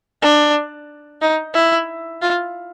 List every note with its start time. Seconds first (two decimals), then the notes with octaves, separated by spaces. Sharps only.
0.22 D4
1.22 D#4
1.54 E4
2.22 F4